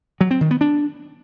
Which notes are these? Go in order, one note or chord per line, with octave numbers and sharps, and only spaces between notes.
F#3
C4
D#3
B3
D4